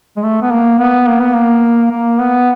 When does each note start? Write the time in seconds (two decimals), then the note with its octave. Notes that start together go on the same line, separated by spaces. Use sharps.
0.17 G#3
0.23 A3
0.42 B3
0.51 A#3
0.79 B3
1.07 A#3
1.21 B3
1.34 A#3
1.91 A#3
2.21 B3